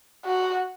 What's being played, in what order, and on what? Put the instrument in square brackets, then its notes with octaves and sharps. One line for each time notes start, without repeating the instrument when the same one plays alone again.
[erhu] F#4